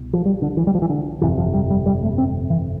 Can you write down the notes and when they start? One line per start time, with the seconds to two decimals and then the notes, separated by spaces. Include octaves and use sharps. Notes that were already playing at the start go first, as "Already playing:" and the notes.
Already playing: C2 B2
0.13 F3
0.25 G3
0.42 D3
0.57 E3
0.67 G3
0.75 F3
0.82 E3
0.90 D3
1.21 G1 F2 C3 E3
1.38 F3
1.54 G3
1.70 G3
1.86 G3
2.03 A3
2.18 C4
2.50 E3